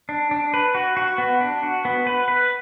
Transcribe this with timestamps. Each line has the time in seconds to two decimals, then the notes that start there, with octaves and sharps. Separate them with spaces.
0.09 D4
0.31 D4
0.54 B4
0.75 F#4
0.97 F#4
1.18 B3
1.40 D4
1.63 F#4
1.85 B3
2.07 B4
2.28 B4